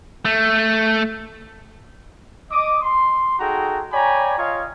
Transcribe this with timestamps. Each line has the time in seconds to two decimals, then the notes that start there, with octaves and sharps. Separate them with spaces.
0.25 A3
2.51 D#5 D6 D#6
2.82 C6
3.39 D#4 F#4 G#4 A4 G5 A#5
3.93 C#5 D5 G5 G#5 A#5 B5
4.39 F4 C#5 D#5 F5